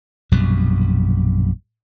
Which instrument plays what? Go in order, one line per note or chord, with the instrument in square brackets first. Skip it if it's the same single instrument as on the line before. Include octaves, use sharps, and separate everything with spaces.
[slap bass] A#1 F#2 B2 G3